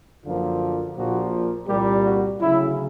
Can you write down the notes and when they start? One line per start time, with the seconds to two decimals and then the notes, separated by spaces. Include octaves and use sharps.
0.25 F#2 D3 F3 A#3 F4
0.96 A#1 A#2 F3 A#3 F#4
1.68 C2 A#2 G3 A#3 G4
2.04 F#4
2.40 D2 C#3 F#3 E4